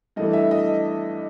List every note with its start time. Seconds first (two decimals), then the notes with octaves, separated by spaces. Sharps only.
0.16 G2 E3 A3 D4 D#5
0.33 E5
0.51 D#5